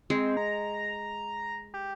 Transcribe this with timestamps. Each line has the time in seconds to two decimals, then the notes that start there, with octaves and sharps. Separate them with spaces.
0.10 G#3 C4
0.37 A#5
1.74 G4